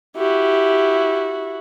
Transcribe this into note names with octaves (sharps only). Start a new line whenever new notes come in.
E4 F#4 G4